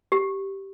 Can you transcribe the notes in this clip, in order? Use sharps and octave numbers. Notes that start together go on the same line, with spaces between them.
G4